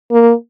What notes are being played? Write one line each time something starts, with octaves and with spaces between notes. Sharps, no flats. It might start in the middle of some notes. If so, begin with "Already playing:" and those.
A#3